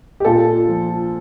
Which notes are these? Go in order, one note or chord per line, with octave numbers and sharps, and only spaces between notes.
G4
A#2 F4 A4
F3